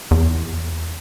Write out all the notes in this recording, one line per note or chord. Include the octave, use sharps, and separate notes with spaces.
E2